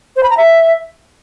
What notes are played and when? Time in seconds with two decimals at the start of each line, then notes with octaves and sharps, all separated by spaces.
0.16 C5
0.23 B5
0.30 A#5
0.37 E5